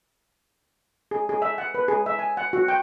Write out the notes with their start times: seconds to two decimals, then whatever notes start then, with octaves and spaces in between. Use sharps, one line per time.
1.11 G#4
1.29 G#4
1.42 E5
1.58 F#5
1.75 B4
1.88 G#4
2.06 E5
2.19 G#5
2.37 F#5
2.53 F#4
2.68 G5